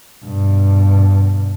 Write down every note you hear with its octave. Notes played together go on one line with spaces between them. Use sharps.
G2 B2